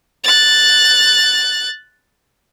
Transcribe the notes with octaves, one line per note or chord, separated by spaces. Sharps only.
F#6 A6